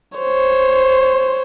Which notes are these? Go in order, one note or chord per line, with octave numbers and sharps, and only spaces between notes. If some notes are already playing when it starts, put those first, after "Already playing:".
C5 C#5